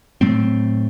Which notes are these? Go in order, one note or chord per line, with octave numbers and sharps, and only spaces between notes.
A2 F#3 A3 C4